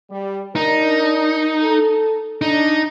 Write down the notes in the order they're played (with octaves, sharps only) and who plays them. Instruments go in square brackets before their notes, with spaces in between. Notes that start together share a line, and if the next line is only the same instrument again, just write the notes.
[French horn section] G3
[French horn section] D4 A#4 [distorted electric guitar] D#4
[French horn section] A4
[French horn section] D4 [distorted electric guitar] D#4